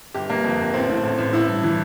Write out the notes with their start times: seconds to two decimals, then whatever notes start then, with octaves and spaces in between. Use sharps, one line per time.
0.14 G1 G4
0.29 G1 A#3
0.44 F2
0.59 G1
0.74 A1 C4
0.89 A2
1.03 A1
1.18 A1
1.33 A1 E4
1.48 G2
1.63 E3